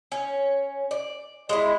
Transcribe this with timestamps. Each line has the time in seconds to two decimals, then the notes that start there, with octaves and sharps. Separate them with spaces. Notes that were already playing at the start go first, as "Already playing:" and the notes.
0.12 C#4
0.91 D5
1.49 G#3 E4